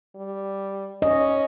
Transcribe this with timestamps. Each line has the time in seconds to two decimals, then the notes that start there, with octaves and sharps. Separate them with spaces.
0.15 G3
1.02 C#4 D#5